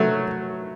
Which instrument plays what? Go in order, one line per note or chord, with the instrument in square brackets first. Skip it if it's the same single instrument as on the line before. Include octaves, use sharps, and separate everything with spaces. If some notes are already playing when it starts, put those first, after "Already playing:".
Already playing: [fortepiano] F#3 A3